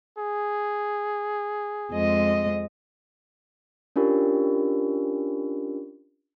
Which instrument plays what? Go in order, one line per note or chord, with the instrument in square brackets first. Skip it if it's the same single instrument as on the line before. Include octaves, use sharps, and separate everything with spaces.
[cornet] G#4
[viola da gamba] F2 G#3 D#5
[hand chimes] C#4 D4 F4 G4 A#4